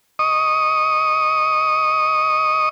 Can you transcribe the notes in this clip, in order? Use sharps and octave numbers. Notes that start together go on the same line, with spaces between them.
D#5 C#6 D#6